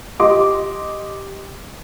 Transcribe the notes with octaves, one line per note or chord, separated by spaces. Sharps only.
G4 D#5 C6 D6